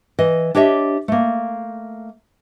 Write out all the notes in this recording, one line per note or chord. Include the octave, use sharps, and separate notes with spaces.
E3 D#5
D4 G4 C#5 D#5 E5
A3 A#3